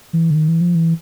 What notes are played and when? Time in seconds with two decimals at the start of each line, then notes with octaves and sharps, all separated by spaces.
0.13 E3
0.31 D3
0.35 D#3
0.48 E3
0.61 F3
0.75 E3